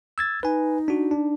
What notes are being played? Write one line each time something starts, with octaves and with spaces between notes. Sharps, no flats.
E6 G#6 A6
D#4 B4 G#5
D4 F#4
D4